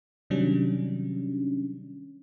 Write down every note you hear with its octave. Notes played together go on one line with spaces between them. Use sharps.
C3 D#3 F#3 G3 C#4 D4